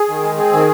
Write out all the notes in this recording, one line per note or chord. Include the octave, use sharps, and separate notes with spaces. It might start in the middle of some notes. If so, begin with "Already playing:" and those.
Already playing: G#4
D#3
G#3
C4 G#4
D#3